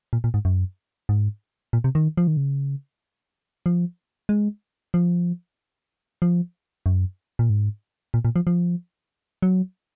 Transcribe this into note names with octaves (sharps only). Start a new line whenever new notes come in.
A#2
A#2
G#2
F#2
G#2
A#2
C3
D#3
F3
D#3
C#3
F3
G#3
F3
F3
F#2
A#2
G#2
A#2
A#2
F3
F3
F#3